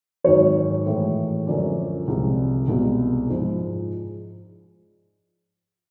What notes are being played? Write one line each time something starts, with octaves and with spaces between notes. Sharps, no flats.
G#2 D#3 F#3 C#5
A2 E3 G#3
F#2 D3 F3 G#3 D5
C2 C3 F3 G#3
C2 B2 G#3
G#2 F3 G#3